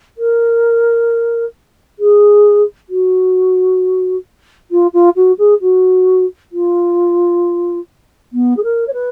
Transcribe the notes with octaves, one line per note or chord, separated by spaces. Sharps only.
A#4
G#4
F#4
F4
F4
F#4
G#4
F#4
F4
B3
G#4
A#4
C#5
B4